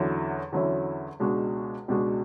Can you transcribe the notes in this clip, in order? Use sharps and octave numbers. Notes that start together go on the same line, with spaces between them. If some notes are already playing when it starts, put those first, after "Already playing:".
Already playing: E2 D3 F#3 C#4 E4
E2 D3 F#3 C#4 E4
C#2 B2 G#3 D4 F#4
C#2 B2 G#3 D4 F#4